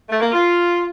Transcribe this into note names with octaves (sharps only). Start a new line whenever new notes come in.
A3
A#3
F4